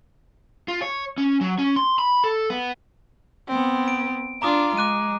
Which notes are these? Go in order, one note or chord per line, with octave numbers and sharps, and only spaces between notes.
F4
C#5
C#4
F#3
C#4
C6
B5
A4
B3
B3 C4
D7
D4 F4 A#5 D6 D#6
G#3 D6 F#6 D#7